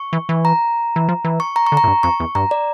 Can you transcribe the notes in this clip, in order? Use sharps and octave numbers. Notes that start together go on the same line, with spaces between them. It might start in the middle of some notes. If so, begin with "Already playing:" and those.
Already playing: C#6
E3
E3
A#5
E3
F3
E3
C#6
A#5
C#6
D3
A#5
A2
G2
F2 C#6
E2
G2 A#5
D5